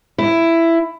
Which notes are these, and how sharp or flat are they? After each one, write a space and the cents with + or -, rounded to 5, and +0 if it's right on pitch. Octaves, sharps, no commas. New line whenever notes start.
E4 +10